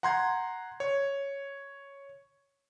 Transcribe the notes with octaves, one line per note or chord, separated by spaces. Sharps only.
F#5 A#5 C6 G6 G#6
C#5